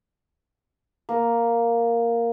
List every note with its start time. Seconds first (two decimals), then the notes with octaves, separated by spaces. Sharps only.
1.09 A#3